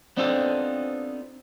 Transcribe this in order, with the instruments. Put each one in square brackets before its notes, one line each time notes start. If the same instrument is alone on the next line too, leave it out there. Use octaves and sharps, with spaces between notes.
[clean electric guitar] B3 C4 D4 D#4 F4 A4